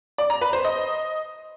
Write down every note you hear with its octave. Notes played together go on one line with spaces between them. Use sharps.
D5
A#5
B4
C5
D#5